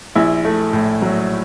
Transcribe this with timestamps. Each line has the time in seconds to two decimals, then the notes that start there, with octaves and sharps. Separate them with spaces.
0.15 A#1 E4
0.45 A3
0.73 A2
1.02 F#3